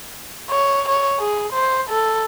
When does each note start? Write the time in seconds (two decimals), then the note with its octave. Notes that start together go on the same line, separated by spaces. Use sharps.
0.50 C#5
0.88 C#5
1.20 G#4
1.53 C5
1.90 A4